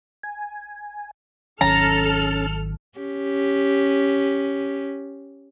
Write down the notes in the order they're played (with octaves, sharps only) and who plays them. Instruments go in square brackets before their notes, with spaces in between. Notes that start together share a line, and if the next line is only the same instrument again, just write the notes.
[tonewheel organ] G#5
[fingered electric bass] G#1 D#3 F#3 [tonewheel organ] C#4 A6 [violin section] A4 F6 [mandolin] A#5
[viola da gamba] C#4 G4